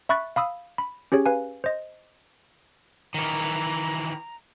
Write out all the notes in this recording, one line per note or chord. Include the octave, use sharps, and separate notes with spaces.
E5 B5 C#6 F#6 A6
F5 B5 D#6 E6
B5
C#4 G4 G#4 C#5
B4 F5 G#5
C5 D#5
D#3 E3 A#5